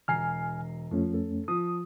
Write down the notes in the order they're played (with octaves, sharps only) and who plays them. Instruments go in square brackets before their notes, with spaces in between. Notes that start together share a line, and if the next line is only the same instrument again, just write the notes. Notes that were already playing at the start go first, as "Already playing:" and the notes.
[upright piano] E1 A#5 C7 [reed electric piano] G#5 F6
[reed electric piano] F2 A3 C#4 [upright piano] F3
[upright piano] A4
[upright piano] F3 [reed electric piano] D#6